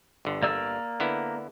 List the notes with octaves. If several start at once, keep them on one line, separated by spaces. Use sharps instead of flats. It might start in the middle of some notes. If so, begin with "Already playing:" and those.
G1 D3
A#3 D5 E6
D3 B3 E4